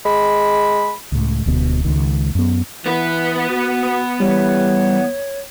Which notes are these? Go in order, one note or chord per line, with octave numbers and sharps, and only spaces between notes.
G#3 B5
C#2 A2
D1 D2 B2
C#2 D#3
F#2 B3
E3 B3 B4
F#4
E3 G3 C#5